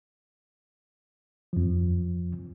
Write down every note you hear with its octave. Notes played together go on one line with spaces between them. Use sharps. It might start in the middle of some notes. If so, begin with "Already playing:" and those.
F2 F3